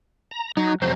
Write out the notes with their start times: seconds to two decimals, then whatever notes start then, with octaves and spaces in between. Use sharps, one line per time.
0.31 A#5
0.57 F#3 D#4
0.82 F2 C3 F#3 C5